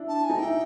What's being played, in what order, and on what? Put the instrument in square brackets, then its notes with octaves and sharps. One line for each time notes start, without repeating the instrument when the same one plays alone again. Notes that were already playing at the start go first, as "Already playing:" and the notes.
Already playing: [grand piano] D4 E4
[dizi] A5
G#5
[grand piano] D#4
[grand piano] E4 [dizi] G5